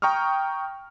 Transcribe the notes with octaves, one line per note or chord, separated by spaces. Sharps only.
G5 A#5 C#6 D#6 F6